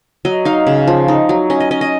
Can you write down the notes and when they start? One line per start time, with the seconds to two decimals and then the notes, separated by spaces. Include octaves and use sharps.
0.25 F#3 D#5
0.45 D#4 F5
0.67 C#3
0.87 F3
1.08 D#4
1.29 F#3
1.50 C#4 D#5
1.60 D#5
1.71 C#4 D#5
1.81 D#5